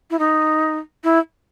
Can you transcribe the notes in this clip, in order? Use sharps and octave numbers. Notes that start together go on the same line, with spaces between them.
E4
D#4
E4